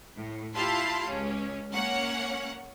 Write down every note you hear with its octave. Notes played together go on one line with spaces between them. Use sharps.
A2
E4 F4 G4 F5 A5 C6
C#2 C#4
A#3 C#4 C#5 F#5